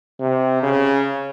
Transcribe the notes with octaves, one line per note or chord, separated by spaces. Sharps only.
C3
C#3